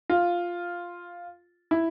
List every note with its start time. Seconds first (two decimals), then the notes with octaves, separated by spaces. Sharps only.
0.09 F4
1.71 E4